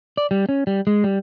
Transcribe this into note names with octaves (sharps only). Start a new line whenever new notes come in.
D5
G3
C#4
G3
G#3
G3